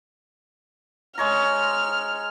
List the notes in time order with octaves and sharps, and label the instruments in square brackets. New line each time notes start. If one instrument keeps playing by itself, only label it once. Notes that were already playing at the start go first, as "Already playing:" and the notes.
[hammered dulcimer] G#3 C#5 A#5 [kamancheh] F6